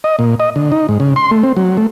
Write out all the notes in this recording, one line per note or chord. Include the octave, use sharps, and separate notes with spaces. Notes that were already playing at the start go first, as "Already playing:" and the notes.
D#5
A#2
D#5
D3
D#4
G#2
C#3
C6
A3
C4
F#3
A3